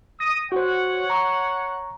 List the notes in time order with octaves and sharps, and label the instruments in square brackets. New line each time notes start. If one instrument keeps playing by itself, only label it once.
[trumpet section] D#6 [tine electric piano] A#6
[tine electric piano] F#4 C5 [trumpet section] C#5 F#5
[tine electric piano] A#5 C#6